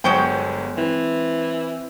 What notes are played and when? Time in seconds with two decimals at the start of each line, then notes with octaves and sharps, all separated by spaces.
0.04 G1 F#3 G#3 B3 C5 C#5 G5
0.77 E3 C4